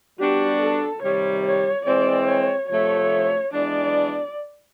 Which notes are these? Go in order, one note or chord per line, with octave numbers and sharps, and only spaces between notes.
G3 B3 D4 F#4 G4
A4
C3 D#3 G3 C#5
C#5
E3 G#3 C4 D5
C#5
C3 F3 A3 C#5
E3 G#3 B3 D4 D5